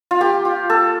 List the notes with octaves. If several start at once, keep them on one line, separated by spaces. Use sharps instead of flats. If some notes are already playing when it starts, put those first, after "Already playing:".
F4
A#3 G4
F4
A#3 A4